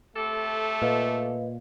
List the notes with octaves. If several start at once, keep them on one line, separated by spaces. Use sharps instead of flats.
A3 C4 G4 A4
A#2 B4 D#5 F5